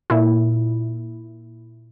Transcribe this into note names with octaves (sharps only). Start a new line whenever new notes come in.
A#2 E4